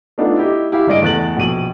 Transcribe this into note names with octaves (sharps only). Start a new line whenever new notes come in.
A3 B3 D4 D#4 F4 A4
E4 G4 D#5
E4 G4 F5
F#1 G2 G#4 D5 D#5 D7
E2 A3 F#6 A6 F#7
A#1 B2 D#7 F#7